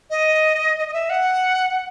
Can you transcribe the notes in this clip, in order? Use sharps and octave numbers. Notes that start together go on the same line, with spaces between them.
D#5
D#5
D#5
E5
F#5